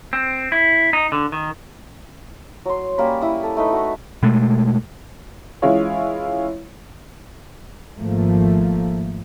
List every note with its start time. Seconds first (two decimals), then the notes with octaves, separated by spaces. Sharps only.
0.13 C4
0.52 E4
0.93 D#4
1.12 D3
1.32 D#3
2.66 F#3 C6
2.98 G3 A#3 C#4 B5
3.21 E4 D#6
3.43 A4
3.57 A3 D#4 B4
3.72 F#4
4.23 B2 G#3 A3
5.62 E3 G#3 C#4 E4 F4 C#5
7.99 G#1 F3 A3 A#3